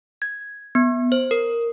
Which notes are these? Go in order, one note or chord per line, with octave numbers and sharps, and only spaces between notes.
G#6
B3
C5
A#4